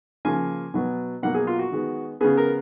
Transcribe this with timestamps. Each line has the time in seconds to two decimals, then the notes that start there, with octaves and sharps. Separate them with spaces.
0.25 C#3 F3 A#3 G#5
0.74 B2 F#3 B3
1.23 B2 F#3 A#3 F#5
1.34 G#4
1.47 F4
1.59 F#4
1.72 D#3 G#3 B3
2.21 C#3 G#3 B3 G#4
2.37 A#4